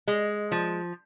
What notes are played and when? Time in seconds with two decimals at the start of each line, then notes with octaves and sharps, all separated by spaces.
0.08 G#3
0.52 F3